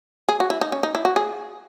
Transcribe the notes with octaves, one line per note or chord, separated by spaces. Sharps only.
G#4
F#4
E4
D#4
C#4
D#4
E4
F#4
G#4